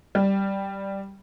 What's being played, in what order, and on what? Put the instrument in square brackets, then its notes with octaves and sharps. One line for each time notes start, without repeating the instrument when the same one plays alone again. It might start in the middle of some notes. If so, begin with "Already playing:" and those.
[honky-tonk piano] G3